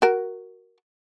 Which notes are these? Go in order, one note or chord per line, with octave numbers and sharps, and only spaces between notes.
F#4 A#4